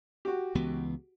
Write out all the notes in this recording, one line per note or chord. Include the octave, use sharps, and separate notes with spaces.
F#4 G4
C#2 E3 B3